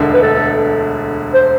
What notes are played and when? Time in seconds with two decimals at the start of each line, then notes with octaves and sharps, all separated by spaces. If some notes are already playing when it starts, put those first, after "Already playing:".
Already playing: E1 D2 D3
0.13 B4
0.22 A4
1.34 C5